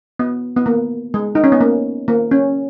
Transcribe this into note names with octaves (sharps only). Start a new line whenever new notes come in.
B3
B3
A#3
G#3
D#4
C#4
B3
A#3
A#3
C#4